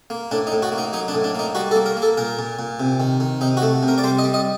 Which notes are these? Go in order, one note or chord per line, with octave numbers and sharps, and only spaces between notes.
A#3
A2 D4
D#4
A2
F#4
A#3
D#4
F#3 D#4
D4
A2
D4
A#3 D#4
G3 F#4
A4
A#3
A#4
A#3
A4
A#2 A#4
A#2
A#2
C3
D#3
D#3
C3 D#4
F#4
A3
C3
A#4
D5
G3 C5
D#5
G3
D#5